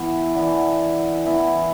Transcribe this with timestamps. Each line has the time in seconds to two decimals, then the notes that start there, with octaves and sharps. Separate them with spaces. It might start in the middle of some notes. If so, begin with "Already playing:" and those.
Already playing: E3 B3 E4
0.34 E3 B3 D4
1.26 E3 B3 E4